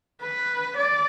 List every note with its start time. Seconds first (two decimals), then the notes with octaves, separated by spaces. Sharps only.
0.21 B4
0.77 D5